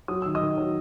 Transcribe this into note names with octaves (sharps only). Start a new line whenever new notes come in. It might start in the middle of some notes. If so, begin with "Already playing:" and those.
F#3 D#6
D#3 E6
D#5 D#6
D#3
F#3